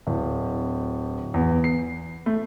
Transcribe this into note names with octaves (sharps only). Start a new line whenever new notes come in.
D1
E2
C7
A3